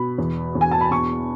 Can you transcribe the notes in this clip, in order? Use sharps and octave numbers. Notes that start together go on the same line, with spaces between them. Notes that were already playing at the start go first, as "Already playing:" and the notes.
Already playing: B2 B5
E2
E2
G#5
A5
B5
B2 C#6